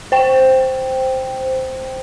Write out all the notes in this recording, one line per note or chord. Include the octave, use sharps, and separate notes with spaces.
C5 G5